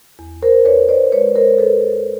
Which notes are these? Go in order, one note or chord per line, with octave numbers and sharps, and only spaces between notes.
E2
A#4 C5
E2 B4 C#5
C5 D5
G#3 B4 C#5
A#4 C5
E2 A4 B4